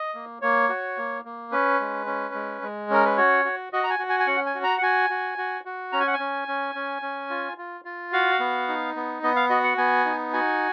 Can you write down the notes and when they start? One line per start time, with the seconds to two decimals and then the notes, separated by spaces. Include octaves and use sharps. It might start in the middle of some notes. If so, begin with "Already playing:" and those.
Already playing: D#5
0.14 A#3
0.42 A#3 C#5
0.69 F#4
0.97 A#3
1.25 A#3
1.52 C#4 B4
1.80 G#3
2.06 C#4
2.34 G#3
2.62 G#3
2.90 C#4 A#4
3.05 B4
3.17 F#4 C#5
3.45 F#4
3.73 F#4 D#5
3.84 A#5
3.90 G#5
3.99 F#4
4.09 G#5
4.20 G#5
4.27 C#4 F#5
4.46 G#5
4.55 F#4
4.63 A#5
4.78 F#5
4.82 F#4 G#5
5.10 F#4
5.38 F#4
5.65 F#4
5.92 C#4 A#5
6.00 G#5
6.07 F#5
6.14 G#5
6.19 C#4
6.48 C#4
6.75 C#4
7.02 C#4
7.30 F4
7.58 F4
7.85 F4
8.12 F#4 F5
8.39 B3
8.68 D#4
8.96 B3
9.23 B3 D#5
9.36 F5
9.50 F#4 D#5
9.64 F#5
9.78 B3 G#5
10.05 D#4
10.33 F#4 G#5